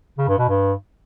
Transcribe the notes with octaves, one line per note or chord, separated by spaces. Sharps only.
C#3
G2
B2
G2